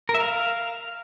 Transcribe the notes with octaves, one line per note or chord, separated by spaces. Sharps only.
A#4
E5
F5